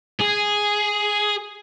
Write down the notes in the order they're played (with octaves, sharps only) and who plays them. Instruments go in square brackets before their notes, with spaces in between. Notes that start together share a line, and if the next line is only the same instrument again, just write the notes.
[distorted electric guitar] G#4